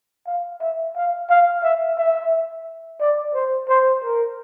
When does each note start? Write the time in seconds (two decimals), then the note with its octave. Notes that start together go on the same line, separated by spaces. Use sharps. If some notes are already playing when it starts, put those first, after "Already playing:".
0.27 F5
0.61 E5
0.96 F5
1.30 F5
1.63 E5
1.98 E5
3.00 D5
3.34 C5
3.69 C5
4.03 A#4